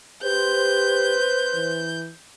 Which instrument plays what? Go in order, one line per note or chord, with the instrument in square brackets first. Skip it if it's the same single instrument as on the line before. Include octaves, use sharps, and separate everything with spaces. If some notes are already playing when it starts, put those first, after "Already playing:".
[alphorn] G4 [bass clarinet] B4 [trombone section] C5 [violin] G6
[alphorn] E3